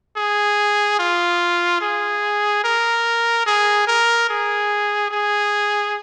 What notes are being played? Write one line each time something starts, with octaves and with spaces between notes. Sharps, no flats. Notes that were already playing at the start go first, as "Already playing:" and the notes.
G#4
F4
G#4
A#4
G#4
A#4
G#4
G#4